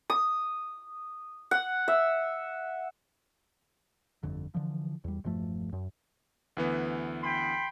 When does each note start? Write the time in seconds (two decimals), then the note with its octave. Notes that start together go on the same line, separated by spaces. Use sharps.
0.10 D#6
1.51 F#5
1.88 E5
4.23 G1 F2 D3
4.54 D3 E3 F3
5.04 E2 G3
5.24 E1 G2 F3 A3
5.73 F#2
6.57 D2 E3 B3
7.24 G5 B5 C6